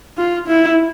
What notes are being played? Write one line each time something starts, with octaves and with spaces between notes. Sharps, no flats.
F4
E4